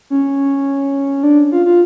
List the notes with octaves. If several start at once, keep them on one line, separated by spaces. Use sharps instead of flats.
C#4
D4
F4
F4